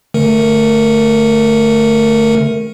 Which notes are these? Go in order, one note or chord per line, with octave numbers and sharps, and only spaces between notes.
D3 A3 A#4